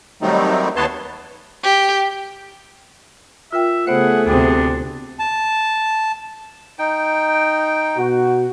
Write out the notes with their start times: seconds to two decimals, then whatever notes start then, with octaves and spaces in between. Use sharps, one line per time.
0.22 D#3 F#3 G3 A3 C4 D#4
0.76 D#2 B3 B4 C#5 A5 C6
1.63 G4
3.53 F4 A#4 E5 G5
3.87 C#3 A3 B3 G#4 C5 F#5
4.26 D2 C3 B3 D4 G5 D6
5.19 A5
6.79 D#4 G5
7.97 B2 F#4